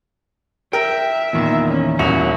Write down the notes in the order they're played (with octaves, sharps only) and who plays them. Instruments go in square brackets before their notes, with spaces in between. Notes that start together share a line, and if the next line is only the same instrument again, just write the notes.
[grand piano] A#4 [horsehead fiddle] E5 [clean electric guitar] G5
[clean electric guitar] E2 A#2 D#3
[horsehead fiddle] C#4
[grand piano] D#1 E4 F7 [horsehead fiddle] C#4 [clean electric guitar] F#4